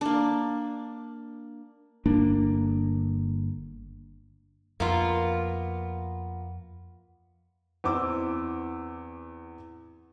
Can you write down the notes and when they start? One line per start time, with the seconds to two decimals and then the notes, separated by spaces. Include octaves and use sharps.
0.01 A#3 D4
2.06 G1 A#3 D4
4.80 F2 A#3 B3 F4
7.84 E2 C4 D6 E6